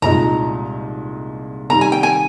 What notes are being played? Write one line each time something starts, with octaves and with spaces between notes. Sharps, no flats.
C2 A#2 G#3 D#4 A#5
C3 D#3 G3 A#5
G#5
G5
G#5